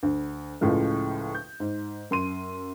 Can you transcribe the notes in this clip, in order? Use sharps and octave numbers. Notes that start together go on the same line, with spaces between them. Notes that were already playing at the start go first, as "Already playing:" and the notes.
D2
C#2 A2 C#3 F3 G#3
G6
G#2
F#2 C6 D#7